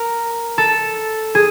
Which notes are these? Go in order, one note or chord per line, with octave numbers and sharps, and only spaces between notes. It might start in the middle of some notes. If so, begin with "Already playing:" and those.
Already playing: A#4
A4
G#4